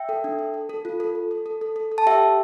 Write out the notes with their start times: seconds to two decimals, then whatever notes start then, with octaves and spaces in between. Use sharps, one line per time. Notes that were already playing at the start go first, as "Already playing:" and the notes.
Already playing: E5 G5
0.09 A4
0.24 D4
0.39 A4
0.54 A4
0.69 A4
0.85 F4
1.00 A4
1.15 A4
1.31 A4
1.46 A4
1.61 A4
1.76 A4
1.91 A4
1.98 A5
2.06 G4 E5 G5
2.22 G4